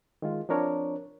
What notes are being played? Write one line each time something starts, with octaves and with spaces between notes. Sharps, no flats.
D#3 G#3 F4
F3 C4 D4 A#4 C#5